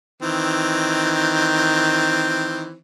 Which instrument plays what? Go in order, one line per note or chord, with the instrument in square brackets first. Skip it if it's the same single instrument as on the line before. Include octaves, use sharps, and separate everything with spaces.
[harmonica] D#3 E3 C4